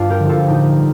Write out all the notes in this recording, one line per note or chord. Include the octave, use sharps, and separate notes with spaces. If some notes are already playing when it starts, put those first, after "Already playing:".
Already playing: G2 D4 F4
G4 A#4
D3 F3
F4 A4
A2 D#4 G4
G3